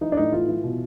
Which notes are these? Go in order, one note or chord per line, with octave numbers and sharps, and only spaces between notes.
E3 D#4
D4
A2 D#4
E3 F4
E3
B2